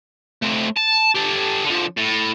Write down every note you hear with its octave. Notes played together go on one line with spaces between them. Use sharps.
A3 C4
A5
G4 A4
D3 F3
A2